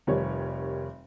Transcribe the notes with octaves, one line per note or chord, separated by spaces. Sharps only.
F1 D#3 G3 C#5